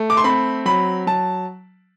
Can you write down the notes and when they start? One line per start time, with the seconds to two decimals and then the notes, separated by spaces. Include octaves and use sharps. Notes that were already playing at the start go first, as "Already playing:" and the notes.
Already playing: A3
0.10 D6
0.17 C6
0.24 C4 B5
0.65 F#3 B5
1.07 F#3 A5